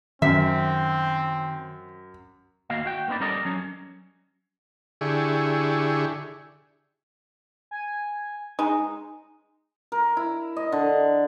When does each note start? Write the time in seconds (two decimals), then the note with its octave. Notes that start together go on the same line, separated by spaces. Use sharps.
0.22 F#2 D#3 C4 C#4 E5
2.70 D#2 A#3 F#4 D#5 F5
2.86 F#4 G5
3.08 A#3 C4 D#4 B4 D5
3.20 G3 C#4 A4 A#4 D5 D#5
3.45 F#3 C#4
5.01 D3 E4 G4 G#4 C#6
7.71 G#5
8.59 G#3 D#4
9.92 A#4
10.17 E4
10.56 D#5
10.72 D3